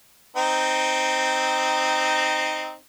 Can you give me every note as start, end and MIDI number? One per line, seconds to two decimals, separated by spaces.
0.36 2.75 60
0.36 2.75 63